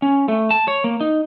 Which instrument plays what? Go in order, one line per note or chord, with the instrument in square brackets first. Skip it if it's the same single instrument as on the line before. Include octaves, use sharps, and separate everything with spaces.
[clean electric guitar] C#4
A3
A5
C#5
A#3
D#4